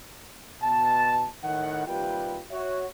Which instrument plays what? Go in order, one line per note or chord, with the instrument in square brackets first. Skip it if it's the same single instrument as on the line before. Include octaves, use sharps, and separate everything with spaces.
[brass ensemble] B2 A5
A2 D#3 F#5
D#2 C3 G3 F4 B4 G5
F#4 C#5 E5